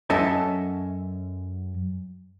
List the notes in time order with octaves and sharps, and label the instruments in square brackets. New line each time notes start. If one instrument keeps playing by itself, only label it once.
[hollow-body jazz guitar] F#2 C#4 A4 D#5 E5 A5